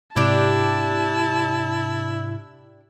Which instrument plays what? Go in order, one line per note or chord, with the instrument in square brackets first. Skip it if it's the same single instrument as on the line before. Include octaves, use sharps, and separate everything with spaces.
[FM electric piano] G#2 C3 [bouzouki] D4 G4 [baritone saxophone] E4 [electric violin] A5